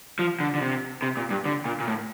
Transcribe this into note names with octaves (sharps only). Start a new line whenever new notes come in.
F3
D3
D3
C3
C3
A#2
G2
D3
A#2
A#2
A2